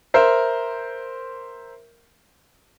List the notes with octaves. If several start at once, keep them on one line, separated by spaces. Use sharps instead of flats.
A#4 C5 E5